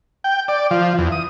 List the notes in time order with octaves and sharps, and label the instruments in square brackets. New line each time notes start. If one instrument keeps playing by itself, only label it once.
[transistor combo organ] G5
D5
F3
E2
D#6